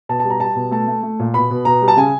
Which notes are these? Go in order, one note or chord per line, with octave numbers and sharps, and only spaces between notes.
B2 A5
A5
G3
A#5
G3 A5
B2
A3 A5
A3
A3
A#2
B2 B5
B2
B2 A#5
G3
A5
C#3 G#5